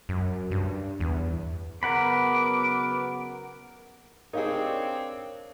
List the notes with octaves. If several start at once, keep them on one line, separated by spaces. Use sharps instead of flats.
F#2
G2
E2
C#3 F#3 B3 A#4 F#5 B5 D6
C4 D4 D#4 G#4 A#4 C#5 F5